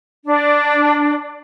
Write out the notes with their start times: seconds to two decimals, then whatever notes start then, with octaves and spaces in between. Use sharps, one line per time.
0.25 D4